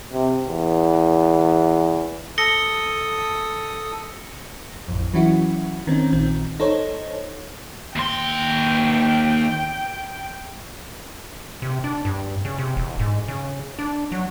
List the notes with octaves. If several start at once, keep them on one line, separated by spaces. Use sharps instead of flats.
C3
E2
A4 D#6 A#6 C#7 G7
A1 F2
E3 F#3 C#4 E4 F#4
D#3 C4 C#4
A#1 D#3 C4
D#4 A4 C5 C#5
D#2 G5 C6
C3
D4
G2
C#3
C3
E1
G#2
C#3
D4
F#3